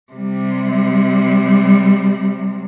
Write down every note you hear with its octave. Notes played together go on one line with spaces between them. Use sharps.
C3 G3